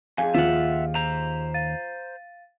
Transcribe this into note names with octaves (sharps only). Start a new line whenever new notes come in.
F2 G#4 F5 G#5
D#2 F3 F4 E5 F#5
C5 A#5
F5 A6 D#7